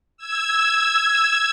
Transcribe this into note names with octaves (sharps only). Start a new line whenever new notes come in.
E6 G#6